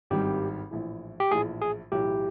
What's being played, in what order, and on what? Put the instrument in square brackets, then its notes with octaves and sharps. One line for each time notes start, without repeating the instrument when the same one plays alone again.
[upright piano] G#1 G2 D#3 G3 C4 [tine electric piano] G4
[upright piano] A#1 A2 E3
[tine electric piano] G4
[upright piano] A#1 A2 E3 [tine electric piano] G#4
[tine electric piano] G#4
[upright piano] B1 A2 E3 [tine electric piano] G4